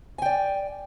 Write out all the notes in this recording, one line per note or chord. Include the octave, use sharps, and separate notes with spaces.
D5 G5 G#5